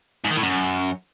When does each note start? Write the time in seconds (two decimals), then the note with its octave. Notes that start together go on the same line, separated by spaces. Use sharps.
0.25 G#2
0.31 D#3
0.37 A2
0.43 F#2